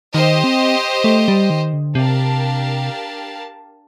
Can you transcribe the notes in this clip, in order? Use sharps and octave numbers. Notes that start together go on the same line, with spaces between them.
D#3 G4 C5 D#5
C4
A3
G3
D#3
D3
C3 D4 G4 A#4 F5 A5